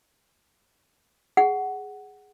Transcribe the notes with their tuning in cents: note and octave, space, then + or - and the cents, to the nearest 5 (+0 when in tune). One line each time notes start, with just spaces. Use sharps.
G#4 +0 F#5 +10